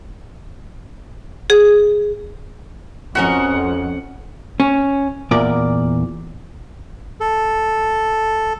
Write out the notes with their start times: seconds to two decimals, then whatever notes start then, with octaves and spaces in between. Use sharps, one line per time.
1.50 G#4
3.15 F2 C#4 F#4 A#4 D#5 F#5 B5
4.60 C#4
5.31 E2 A#2 A#4 D5
7.21 A4